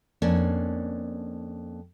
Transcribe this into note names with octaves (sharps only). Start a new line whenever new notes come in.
F2 A#3 C#4 D4